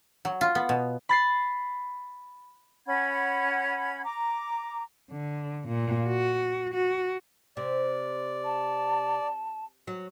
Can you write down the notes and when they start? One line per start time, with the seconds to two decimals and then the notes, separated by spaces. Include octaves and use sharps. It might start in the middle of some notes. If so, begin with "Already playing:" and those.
0.25 F#3
0.41 F4
0.55 B3
0.69 B2
1.09 B5 A6 C7
2.86 C#4 F#5 B5 G#6
4.04 A#5 D6
5.11 D3
5.68 A#2
6.07 F#4
6.74 F#4
7.57 C3 D5
8.45 A5
9.87 F#3